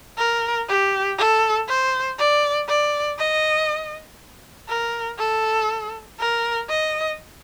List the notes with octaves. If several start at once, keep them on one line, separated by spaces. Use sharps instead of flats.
A#4
G4
A4
C5
D5
D5
D#5
A#4
A4
A#4
D#5